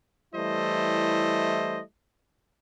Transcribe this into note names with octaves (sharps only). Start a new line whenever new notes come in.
E3 G3 A3 E4 C5 D#5